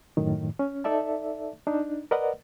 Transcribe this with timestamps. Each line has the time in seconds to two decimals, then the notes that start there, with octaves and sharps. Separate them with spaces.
0.17 F#2 A2 D#3
0.59 C#4
0.84 D#4 A4 D5 E5 A5
1.67 D4 D#4
2.11 A#4 B4 D5 D#5 F#5